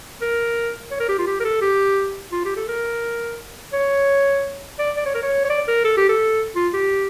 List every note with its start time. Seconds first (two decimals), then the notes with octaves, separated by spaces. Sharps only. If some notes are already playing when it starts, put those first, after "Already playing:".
0.22 A#4
0.91 C#5
1.00 A#4
1.09 G4
1.19 F4
1.27 G4
1.40 A#4
1.45 A4
1.62 G4
2.32 F4
2.45 G4
2.57 A4
2.68 A#4
3.73 C#5
4.79 D5
4.97 D5
5.06 C#5
5.15 A#4
5.23 C#5
5.45 C#5
5.50 D5
5.68 A#4
5.84 A4
5.97 G4
6.09 A4
6.56 F4
6.74 G4